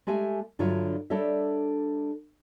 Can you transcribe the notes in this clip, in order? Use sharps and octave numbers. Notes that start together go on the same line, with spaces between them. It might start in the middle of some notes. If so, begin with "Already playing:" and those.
G#3 A3 G4 E5 G#5
G2 D3 F#3 F4 C#5 E5
G3 D4 A4 C#5 D#5 E5